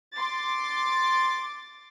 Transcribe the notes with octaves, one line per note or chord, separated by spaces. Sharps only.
C6 D6 A6